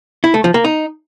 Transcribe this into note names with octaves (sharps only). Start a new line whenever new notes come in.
E4
A3
F3
A#3
D#4